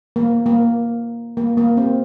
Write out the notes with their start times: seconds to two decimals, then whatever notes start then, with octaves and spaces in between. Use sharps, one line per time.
0.16 A#3
0.46 A#3
1.37 A#3
1.57 A#3
1.77 C4